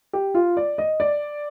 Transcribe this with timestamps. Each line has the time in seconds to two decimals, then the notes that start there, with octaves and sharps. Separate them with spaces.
0.13 G4
0.34 F4
0.57 D5
0.78 D#5
1.00 D5